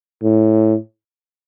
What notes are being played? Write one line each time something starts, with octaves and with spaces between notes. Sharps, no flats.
A2